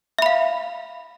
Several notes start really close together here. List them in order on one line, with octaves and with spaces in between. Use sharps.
E5 B5 F5